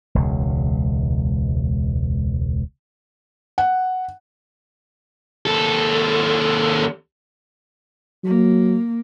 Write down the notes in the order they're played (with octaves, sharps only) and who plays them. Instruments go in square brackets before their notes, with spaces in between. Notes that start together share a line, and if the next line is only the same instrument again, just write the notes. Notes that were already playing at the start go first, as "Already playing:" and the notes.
[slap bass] E1 C#2
[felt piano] F#5
[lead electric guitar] D#2 A4
[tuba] F#3 [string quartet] A#3